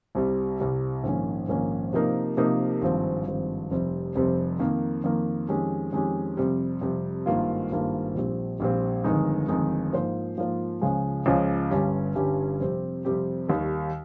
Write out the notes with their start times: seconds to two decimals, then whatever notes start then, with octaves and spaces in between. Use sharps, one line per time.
0.15 C2 C3 G3
0.60 C2 C3 G3
1.03 A#1 G#2 D#3 A#3 C#4
1.48 A#1 G#2 D#3 A#3 C#4
1.93 C3 F3 A#3 D#4 A#4
2.37 C3 F3 A#3 D#4 A#4
2.82 G#1 G2 F3 C4
3.26 G#1 G2 F3 C4
3.71 F1 F2 C3 G3 C4
4.16 F1 F2 C3 G3 C4
4.59 F2 D#3 A#3
5.04 F2 D#3 A#3
5.48 F2 D#3 G#3 C#4 G4
5.93 F2 D#3 G#3 C#4 G4
6.37 F2 C3 G3
6.81 F2 C3 G3
7.26 G#1 G2 D#3 A#3 F4
7.71 G#1 G2 D#3 A#3 F4
8.15 A#1 A#2 G3 C4
8.60 A#1 A#2 G3 C4
9.04 G1 F2 D#3 G#3 D#4
9.48 G1 F2 D#3 G#3 D#4
9.93 G#2 F3 A#3 F4 C5
10.37 G#2 F3 A#3 F4 C5
10.81 C#2 C#3 F3 G#3
11.26 C#2 C#3 F3 G#3
11.70 G1 G2 G3 C#4 G4
12.15 G1 G2 G3 C#4 G4
12.60 F2 C3 G3 C4 G4
13.05 F2 C3 G3 C4 G4
13.48 D#2 D#3 G3